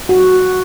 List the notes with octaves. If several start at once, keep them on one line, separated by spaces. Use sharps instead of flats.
F#4